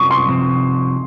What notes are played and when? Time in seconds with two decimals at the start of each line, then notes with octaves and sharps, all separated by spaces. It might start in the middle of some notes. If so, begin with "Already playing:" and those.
Already playing: C3 F#3 C#4 C#6 D#6
0.11 C6
0.28 C3 F3 C4